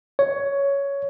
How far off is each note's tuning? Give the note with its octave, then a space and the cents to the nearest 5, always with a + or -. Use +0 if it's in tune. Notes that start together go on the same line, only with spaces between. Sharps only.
C#5 +10